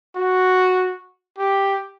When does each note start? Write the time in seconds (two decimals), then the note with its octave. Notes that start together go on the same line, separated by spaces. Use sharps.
0.15 F#4
1.38 G4